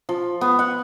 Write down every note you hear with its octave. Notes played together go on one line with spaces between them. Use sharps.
F3
B3
F#5